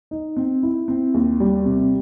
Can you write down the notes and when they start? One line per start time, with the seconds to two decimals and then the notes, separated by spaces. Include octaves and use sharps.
0.11 D#4
0.36 C4
0.63 E4
0.88 C4
1.14 D#2
1.40 G3
1.66 C3